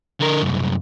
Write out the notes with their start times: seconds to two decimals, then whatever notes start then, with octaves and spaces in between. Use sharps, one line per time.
0.21 D3 A#4
0.42 C2 F#2